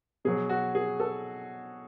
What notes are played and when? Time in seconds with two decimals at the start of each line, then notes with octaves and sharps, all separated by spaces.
0.25 B2 F#3 G#4
0.49 F#4
0.75 G#4
1.00 A4